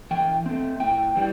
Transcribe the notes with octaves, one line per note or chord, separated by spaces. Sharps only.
E3 G5
A3 C4
A2 G5
E3 G3